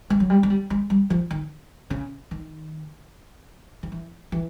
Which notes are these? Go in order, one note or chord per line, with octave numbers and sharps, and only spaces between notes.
G#3
F#3
G3
G#3
G3
G#3
G3
F3
D#3
C#3
D#3
D#3
E3
E3